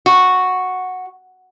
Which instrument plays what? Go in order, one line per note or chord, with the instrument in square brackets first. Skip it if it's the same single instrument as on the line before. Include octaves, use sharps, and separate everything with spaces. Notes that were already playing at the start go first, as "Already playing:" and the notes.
[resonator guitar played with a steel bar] F#4